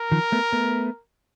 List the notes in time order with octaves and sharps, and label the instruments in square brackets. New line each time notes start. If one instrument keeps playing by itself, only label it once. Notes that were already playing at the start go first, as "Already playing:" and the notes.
Already playing: [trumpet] A#4
[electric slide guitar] D#3 F3
A3 B3
A3 B3